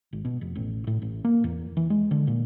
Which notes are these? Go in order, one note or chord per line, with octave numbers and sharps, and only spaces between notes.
G#1
B2
F1
A1
A2
A1
A#3
E2
E3
G#3
D3
A#2